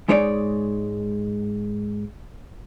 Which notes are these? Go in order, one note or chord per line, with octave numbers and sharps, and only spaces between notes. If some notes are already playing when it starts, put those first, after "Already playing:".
G#2 G#3 D#4 C#5 D5